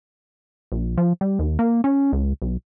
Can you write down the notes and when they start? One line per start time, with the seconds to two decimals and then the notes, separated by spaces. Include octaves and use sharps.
0.72 A#1
0.98 F3
1.21 G3
1.39 D#2
1.59 A#3
1.84 C#4
2.13 C#2
2.42 B1